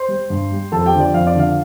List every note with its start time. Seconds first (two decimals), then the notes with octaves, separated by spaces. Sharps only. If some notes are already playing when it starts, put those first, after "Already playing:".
Already playing: C5 C6
0.08 G3
0.30 G2
0.51 G3
0.72 F2 A4 A5
0.86 G4 G5
0.93 D3 F3
1.00 D5
1.14 F2 F5
1.27 D5
1.35 D3 F3 F5